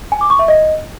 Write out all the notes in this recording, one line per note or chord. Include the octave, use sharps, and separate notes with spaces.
G#5
D6
C#6
E5
D#5